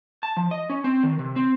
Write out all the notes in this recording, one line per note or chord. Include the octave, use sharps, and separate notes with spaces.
A5
F3
D#5
C#4
C4
D#3
C3
C4